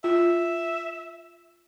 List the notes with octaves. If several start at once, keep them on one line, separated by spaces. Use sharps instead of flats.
F4 E5